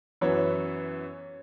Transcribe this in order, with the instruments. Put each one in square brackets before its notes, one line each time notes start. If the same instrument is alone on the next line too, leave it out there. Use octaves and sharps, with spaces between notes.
[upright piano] F#2 E3 B3 [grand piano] C#5